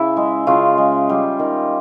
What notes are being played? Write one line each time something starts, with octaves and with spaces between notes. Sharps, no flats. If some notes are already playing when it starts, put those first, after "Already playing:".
Already playing: C#3 E4
G#3
C#3 F4
G#3
G3
D#3